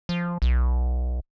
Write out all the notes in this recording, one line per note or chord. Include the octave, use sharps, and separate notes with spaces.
F3
B1